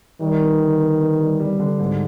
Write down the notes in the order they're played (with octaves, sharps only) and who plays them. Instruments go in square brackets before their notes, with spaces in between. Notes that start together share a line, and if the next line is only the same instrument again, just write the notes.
[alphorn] D#3 [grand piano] G3
[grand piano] B3
D3
B3
B3
G3
G3
D3
G#2